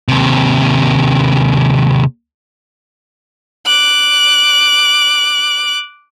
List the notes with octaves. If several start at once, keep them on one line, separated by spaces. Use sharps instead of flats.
D#2 C3
D6 F#6